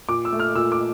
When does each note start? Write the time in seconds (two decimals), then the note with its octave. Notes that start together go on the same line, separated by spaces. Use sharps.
0.09 A#2 D6
0.25 E6
0.32 A3
0.40 F6
0.55 A#2 E6
0.72 D6